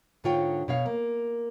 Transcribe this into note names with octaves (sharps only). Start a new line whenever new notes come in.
G#2 D3 D#4 F4 C#5 G5
B2 C#5 F5
A#3